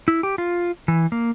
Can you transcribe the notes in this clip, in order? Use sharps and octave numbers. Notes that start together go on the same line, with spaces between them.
E4
G4
F4
E3
A#3